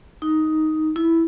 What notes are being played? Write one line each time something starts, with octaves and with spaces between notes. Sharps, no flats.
D#4
E4